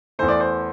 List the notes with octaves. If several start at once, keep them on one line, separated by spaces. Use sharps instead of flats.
E2 E3 A3 C5
D5
C5